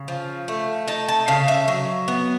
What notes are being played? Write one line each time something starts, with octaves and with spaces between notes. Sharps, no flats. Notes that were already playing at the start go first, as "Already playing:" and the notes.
Already playing: C#3
F3
A3
D#4 A5
A5
C#3 F5
E5
F#3
B3